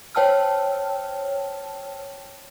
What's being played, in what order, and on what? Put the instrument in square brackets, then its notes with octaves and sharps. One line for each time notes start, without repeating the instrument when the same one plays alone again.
[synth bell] C5 C#5 G5 A5 E6 F6